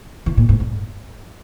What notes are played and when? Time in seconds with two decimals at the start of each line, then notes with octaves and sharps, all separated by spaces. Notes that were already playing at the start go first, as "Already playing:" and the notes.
0.26 E3
0.37 A#2
0.49 G#2
0.60 G2